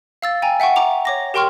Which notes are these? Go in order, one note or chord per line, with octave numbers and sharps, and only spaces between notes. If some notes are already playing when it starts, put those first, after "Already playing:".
F5 E6 A6
G5 G#5 A#5
E5 F#5 G5 C#6
A#5 D6 F7
C#5 D6 A#6
G4 A#4 G5 C6 C#6 F6